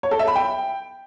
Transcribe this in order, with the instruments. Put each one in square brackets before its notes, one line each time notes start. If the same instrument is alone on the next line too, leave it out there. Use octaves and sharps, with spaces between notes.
[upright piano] C#5
A4
E5
B5
G5